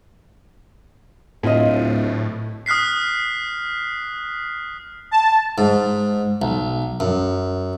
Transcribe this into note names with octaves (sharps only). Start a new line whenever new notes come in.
D1 A2 E4 F4 D#5
D#6 F6 F#6 B6 C7
A5
G#2
B1
F#2